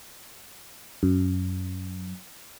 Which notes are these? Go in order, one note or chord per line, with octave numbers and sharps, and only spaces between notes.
F#2